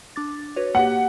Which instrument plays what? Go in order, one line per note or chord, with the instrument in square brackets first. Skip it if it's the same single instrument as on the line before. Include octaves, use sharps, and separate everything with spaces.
[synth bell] D4 D6 A6
F#4 B4 C#5
[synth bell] A#3 G4 [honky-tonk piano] F#5